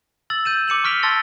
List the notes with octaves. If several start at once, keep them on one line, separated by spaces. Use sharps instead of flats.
E6 A6 F#7
G6 D#7 E7
D6 C#7 E7 F#7
C#6 F6 B6 D7 F7 G7
A5 C6 E6 A6 A#6 G7